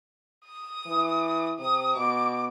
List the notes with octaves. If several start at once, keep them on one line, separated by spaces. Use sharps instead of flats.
D#6
E3
C3 D#6
B2 D6